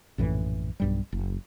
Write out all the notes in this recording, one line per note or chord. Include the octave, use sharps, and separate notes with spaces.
A#1 F#2 A2 E3
B1 G2 G3
F#1